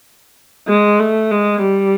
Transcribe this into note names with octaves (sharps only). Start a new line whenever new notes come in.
G#3
A3
G#3
G3